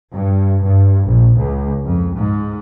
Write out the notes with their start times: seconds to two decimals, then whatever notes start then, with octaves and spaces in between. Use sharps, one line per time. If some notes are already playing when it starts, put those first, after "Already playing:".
0.14 G2
0.65 G2
1.08 A#1
1.38 C#2
1.84 F2
2.16 G#2